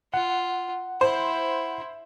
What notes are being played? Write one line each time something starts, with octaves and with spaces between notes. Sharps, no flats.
F4 F#5
E4 C5